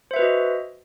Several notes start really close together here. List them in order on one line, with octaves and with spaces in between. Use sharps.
C5 E5 B4 F#4 D#5